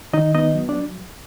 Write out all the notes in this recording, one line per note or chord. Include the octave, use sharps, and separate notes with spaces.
D#3 D#4 D#5
B3 D#4 D#5
F#3
D4 D5